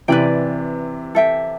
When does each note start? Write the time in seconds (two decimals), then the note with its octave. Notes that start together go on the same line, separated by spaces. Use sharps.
0.08 C3 E3 B4 D5 G5
1.15 A4 E5 G5